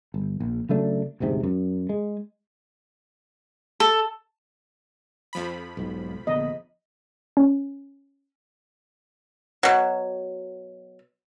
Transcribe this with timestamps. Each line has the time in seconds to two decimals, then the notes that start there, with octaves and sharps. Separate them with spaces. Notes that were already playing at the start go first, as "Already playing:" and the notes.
0.14 G1
0.40 A#1
0.69 C#3 F#3 A3 D4
1.20 E1 D2 G#2 C3
1.43 F#2
1.89 G#3
3.80 A4
5.33 F2 F3 B5
5.77 B1 G#2
6.27 A#1 D3 B3 D#5
7.37 C#4
9.63 B2 F#3